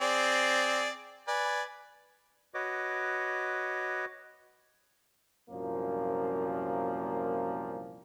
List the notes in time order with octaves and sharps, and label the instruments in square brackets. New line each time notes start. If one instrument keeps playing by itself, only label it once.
[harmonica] C4 G#4 D5
B4 D5 G#5
[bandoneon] F#4 B4 C#5 D#5 D6
[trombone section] C2 F#2 A#2 F3 A#3